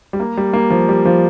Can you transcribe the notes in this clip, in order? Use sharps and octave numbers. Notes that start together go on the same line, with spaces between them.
G3
A#3
G3
A#3
F3
G3
F3